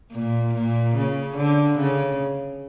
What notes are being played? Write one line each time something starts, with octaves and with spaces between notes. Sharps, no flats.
A#2
A#2
C#3
D3
C#3